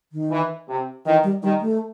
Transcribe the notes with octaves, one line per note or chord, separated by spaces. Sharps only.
D#3
E3
C3
D#3 E3
G3
D#3 G3
A3